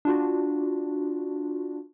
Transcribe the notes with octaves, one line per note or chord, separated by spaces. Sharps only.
D4 F4 F#4